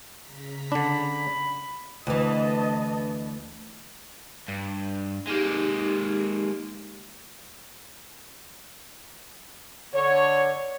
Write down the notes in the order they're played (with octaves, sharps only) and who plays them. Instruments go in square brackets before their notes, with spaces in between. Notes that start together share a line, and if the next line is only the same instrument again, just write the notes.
[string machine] C#3 A#5 B6
[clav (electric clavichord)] D3 D4 [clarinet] B5
[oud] D2 E3 [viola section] D4 D#5 A5
[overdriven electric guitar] G2
[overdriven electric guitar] G#3 A#3 [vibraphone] D#4 G4
[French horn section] D3 C#5